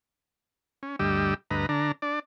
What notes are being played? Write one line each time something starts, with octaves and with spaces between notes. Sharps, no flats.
C#4
D2 G2 G3 G4 D#5 E6
D2 G2 B4 D#5 A#5
D3 D4 A#5
D4 D5